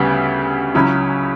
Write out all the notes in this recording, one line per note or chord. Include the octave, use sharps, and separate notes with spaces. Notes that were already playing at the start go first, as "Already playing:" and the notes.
Already playing: D2 C#3 G3 B3 F#4
C#2 C#3 F#3 C#4 E4